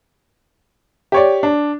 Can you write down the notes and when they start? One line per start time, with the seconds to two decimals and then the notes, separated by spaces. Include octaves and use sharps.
1.12 G4 C#5 D5
1.43 D4